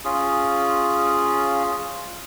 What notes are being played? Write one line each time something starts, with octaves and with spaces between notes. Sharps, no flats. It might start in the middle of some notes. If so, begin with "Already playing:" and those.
C#4 F4 G#4